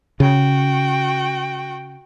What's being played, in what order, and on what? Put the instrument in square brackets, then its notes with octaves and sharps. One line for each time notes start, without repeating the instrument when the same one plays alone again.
[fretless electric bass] C#3 [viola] F#4 G5